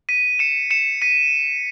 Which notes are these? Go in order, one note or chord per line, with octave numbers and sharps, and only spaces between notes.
B6 D#7
C#7 E7
C#7 E7
B6 D#7